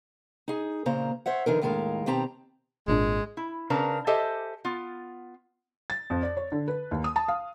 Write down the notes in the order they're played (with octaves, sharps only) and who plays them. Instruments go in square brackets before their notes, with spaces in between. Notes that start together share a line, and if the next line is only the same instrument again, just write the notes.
[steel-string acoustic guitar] D#4 G#4
A#2 C#3 A#3 C5 A#5
C5 C#5 E5 F#5
D3 E3 D#4 A#4
D#2 A2 D#3 G#3 A#4 F5
B2 D#3 C4 G4 A5 A#5
[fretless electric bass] G#1 A#2 D4 [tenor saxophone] G#3
[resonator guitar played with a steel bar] E4
C#3 C4 D4 A#4 B4 A#5
G4 A4 C5 D#5 E5 G#5
B3 F4
[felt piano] A6
F2
D5
C#5
D3
B4
D#2
D#6
A5
F5